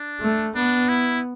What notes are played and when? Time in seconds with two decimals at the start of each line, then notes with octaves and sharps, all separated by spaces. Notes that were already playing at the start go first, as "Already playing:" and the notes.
Already playing: D4
0.21 A3
0.55 B3 D4
0.89 E4